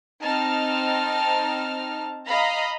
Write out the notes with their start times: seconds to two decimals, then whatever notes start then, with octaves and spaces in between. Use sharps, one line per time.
0.21 C4 D#4 A5 F6
2.26 D#5 F5 A#5 B5